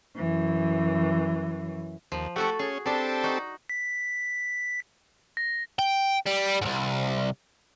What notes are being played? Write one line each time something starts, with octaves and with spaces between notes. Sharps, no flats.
F#2 E3
D#2 F3
A3 F#4 G4 A4 F#5 C#6
C#4 G#4
G3 C4 D4 G4 A4
D#4 F#4
B6
A#6
G5
G3
C2 G#2